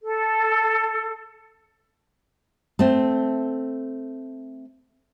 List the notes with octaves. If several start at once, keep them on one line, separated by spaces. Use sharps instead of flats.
A4
A3 C4